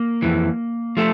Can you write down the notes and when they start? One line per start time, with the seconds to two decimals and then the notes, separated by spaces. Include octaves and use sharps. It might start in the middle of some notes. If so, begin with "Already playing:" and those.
Already playing: A#3
0.22 F2 E3
0.97 F3 A3